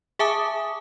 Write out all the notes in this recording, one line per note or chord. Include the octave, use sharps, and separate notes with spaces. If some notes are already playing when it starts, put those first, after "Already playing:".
G#4 E5 G#5 A5 D6 D#6